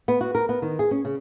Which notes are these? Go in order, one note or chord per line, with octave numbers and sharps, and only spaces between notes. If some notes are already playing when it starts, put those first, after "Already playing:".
B3
F#4
A#4
B3
D#3
G#4
C#4
C#3